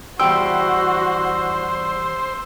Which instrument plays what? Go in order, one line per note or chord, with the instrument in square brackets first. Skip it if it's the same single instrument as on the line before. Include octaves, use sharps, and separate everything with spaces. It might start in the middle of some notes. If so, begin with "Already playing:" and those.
[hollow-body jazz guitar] E2 G3 G5 [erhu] F#4 [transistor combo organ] C5 [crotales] E6